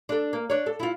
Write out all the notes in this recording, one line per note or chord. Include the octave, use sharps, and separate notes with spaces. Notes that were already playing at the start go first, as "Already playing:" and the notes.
D4 A4
A#3
D4 C#5
A4
E4 F4